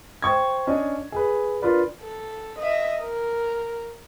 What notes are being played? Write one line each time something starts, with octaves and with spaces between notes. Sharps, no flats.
C5 G5 C#6 G#6
C#4 D4 D#5
G#4 B4
D4 F4 A#4 B4 D5
A4
D#5 E5
A#4